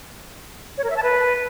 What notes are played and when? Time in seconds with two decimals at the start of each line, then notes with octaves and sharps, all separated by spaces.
0.78 C#5
0.84 A#4
0.90 E5
0.97 A5
1.03 B4